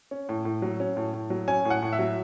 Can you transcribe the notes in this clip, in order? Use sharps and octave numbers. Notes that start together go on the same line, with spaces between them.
C#4
A2
A2
F#3
C#4
A2
A2
F#3
C#4 G#5
A2
F#5
A2
E5
F#3